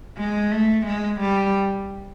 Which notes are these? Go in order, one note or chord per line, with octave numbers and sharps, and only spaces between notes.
G#3
A3
G#3
G3